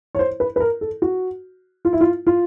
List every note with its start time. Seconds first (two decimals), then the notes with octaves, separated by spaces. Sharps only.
0.15 C#5
0.19 C5
0.40 B4
0.56 B4
0.60 A#4
0.81 A4
1.02 F#4
1.85 F4
1.93 E4
2.01 F4
2.27 F4